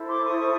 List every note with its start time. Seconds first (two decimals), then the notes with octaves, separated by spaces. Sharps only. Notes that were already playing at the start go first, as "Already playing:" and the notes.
Already playing: E4 A4 C5
0.08 C6 D6
0.24 C#6 D#6